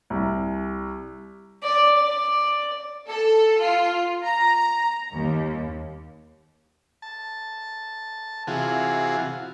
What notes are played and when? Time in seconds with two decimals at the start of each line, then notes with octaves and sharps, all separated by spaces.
0.10 C2
1.63 D5
1.98 D5
3.09 A4
3.63 F4
4.24 A#5
5.13 D#2
7.02 A5
8.47 C3 E3 F4 F#4 G#4